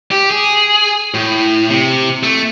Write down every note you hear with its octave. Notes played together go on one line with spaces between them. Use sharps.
G4
G#4
A2
C3
A3